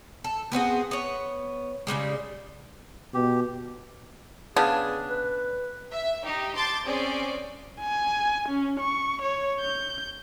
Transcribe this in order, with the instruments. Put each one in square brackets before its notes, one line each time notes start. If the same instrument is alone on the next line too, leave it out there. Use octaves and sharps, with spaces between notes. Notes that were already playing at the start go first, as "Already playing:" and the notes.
[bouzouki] A4
B3 C4 F#4 G#4
B3 C#5
C#3 F3 G3 G#3
[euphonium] B2 [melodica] G4
[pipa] C#3 B3 D4 [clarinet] G#4
[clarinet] B4
[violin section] E5
D#4 G4
A5 C6 D6 G6 A6
C4 C#4 G#4 D5
[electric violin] G#5
C#4
C#6
C#5
G6